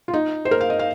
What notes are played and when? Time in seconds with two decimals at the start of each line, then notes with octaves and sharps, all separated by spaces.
0.08 F4
0.14 D#4
0.45 C5
0.51 A#4
0.61 F5
0.70 D#5
0.79 F5